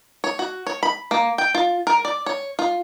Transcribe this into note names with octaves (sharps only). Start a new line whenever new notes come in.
C#5
F#4
C#5
B5
A#3
G5
F4
A#4
D5
C#5
F4